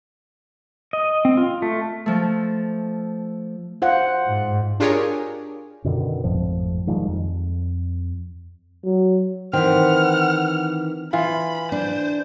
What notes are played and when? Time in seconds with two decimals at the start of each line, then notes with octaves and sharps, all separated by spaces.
0.93 D#5
1.25 C4
1.37 F4
1.62 A3
2.06 F3 A3
3.82 F4 C5 D5 F5 F#5
4.27 G#2
4.80 D4 F4 G4 G#4 A#4 C#5
5.84 F#2 B2 D3 D#3
6.24 G#1 F2 A2 F3
6.87 D#3 F3 G3 G#3
7.08 F2
8.85 F#3
9.53 D#3 E3 C4 F#5 F6
11.13 E3 F4 B5
11.72 D4 C5